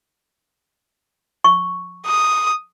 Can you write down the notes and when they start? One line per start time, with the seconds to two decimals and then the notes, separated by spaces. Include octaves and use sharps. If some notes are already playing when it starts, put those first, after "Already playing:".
1.44 C#6
2.07 D#6